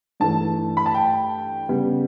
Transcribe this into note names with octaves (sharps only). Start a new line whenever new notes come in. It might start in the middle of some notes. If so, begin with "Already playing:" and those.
G2 E3 A3 A5
B5
A5
G5
C#3 G3 B3